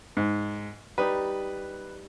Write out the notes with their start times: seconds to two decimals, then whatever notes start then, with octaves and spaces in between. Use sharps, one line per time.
0.17 G#2
0.98 G3 D#4 B4